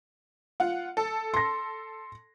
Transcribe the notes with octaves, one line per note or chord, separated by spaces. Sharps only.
F4 F#5
A4
C6 A#6